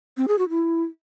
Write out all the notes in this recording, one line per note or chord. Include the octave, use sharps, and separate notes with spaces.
C4
G#4
F#4
E4